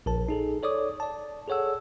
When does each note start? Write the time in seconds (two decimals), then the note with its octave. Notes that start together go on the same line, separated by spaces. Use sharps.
0.06 A#1 A#4 A5
0.29 D#4 G#4 A4
0.63 A4 C#5 D5 D6 D#6
1.00 D5 A5
1.48 G#4 A4 C#5 F#5 E6